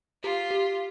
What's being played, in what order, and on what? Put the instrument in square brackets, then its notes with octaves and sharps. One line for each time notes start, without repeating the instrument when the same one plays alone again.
[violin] F4 [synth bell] G4
[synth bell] G4